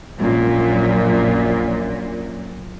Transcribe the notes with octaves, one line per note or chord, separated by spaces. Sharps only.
A#1 F#2 A#2